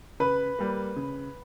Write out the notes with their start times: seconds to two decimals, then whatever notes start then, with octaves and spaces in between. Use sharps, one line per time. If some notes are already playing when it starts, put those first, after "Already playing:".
0.20 C#3 B4 B5
0.59 G3 A#3
0.96 C#3